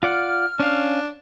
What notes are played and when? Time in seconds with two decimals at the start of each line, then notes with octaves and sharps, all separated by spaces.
0.03 F4 D5 F#5 F6
0.60 C#4 D4 F5